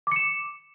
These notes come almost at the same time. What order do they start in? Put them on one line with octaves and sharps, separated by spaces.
D6 C#7 E7